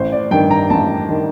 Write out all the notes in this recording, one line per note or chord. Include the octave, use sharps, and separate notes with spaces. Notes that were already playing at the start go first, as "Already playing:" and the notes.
Already playing: A1 C5
D5
G2 D#3 G5
A#5
A1 A5
D#3